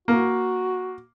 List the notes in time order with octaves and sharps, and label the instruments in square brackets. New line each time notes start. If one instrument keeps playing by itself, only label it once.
[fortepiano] A#3 [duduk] F#4